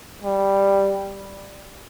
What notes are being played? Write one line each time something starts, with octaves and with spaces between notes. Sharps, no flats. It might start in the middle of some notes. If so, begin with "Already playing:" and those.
G3